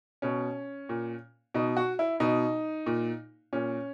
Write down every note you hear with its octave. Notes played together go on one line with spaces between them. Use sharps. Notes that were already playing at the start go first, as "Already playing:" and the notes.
B2 C#4
A#2
B2 D#4
F#4
E4
B2 D#4
A#2
A#2 C#4